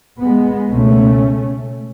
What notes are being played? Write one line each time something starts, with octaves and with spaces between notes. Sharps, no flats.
G#3 B3
C#2 B2 A3 C#4